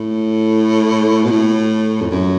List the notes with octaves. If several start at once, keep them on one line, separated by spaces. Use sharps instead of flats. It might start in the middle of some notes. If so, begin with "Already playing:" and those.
Already playing: A2
B2
A2
F2
F#2